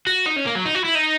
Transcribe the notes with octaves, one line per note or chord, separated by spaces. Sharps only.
F#4
D#4
C#4
A#3
F#3
D#4
F#4
E4
D#4